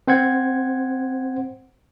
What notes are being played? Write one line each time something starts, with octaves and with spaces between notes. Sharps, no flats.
C4 C5 F#5 G#6